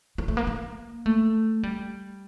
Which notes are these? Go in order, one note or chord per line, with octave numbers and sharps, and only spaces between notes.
A#3
A3
A#3
A#3
A3
G3